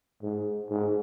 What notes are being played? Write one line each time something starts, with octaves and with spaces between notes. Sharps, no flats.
G#2
G#2